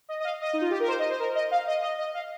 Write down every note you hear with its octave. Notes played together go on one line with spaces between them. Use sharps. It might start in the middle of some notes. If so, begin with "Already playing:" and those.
D#5
D#5
F5
D#5
D#4
F4
G4
A#4
C5
D#5
C5
A#4
D#5
F5
D#5
D#5
D#5
F5